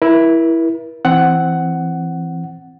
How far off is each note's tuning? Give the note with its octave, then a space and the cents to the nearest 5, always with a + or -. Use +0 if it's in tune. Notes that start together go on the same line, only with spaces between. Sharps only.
E4 +0 A#4 +40
E3 +10 C4 +0 F#5 +10